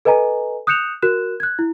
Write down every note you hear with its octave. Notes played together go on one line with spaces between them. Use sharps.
A4 B4 D#5 G#5 A#5
D#6 F#6 G6 C#7 E7 F7
F#4 A#4 F#6 E7
F#6 G#6
E4